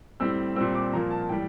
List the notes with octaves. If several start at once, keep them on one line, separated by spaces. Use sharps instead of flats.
A2 G3 C4 E6
A#2 G3 C4 E6
D6
A#2 F3 A#3 A#5
A5
A5
A2 E3 G3 G5